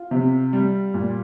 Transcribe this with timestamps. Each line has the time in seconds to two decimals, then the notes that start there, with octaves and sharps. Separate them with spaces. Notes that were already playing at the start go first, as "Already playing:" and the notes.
Already playing: F4
0.11 C3
0.53 G3
0.94 A#2